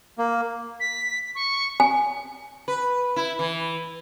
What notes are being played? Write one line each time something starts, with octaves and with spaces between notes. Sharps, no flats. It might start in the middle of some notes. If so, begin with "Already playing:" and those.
A#3
B6
C#6
G#5
B4
E4
E3